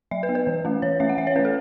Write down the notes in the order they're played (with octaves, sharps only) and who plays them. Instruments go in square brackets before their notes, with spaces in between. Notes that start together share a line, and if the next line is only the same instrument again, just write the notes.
[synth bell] F#3 E5
B4
B3
B4
E3
A3 C#4
E3 C#5
A3 C#4 E5
F#5
E3 E5
C#5
A3 C#4 B4
A4